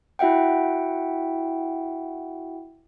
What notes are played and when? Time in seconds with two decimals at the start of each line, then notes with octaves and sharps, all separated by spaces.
0.19 E4 F#4 E5 F#5 G5